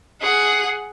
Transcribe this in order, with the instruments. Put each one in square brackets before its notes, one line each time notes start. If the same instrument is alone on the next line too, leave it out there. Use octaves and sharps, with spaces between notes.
[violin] G#4 F#5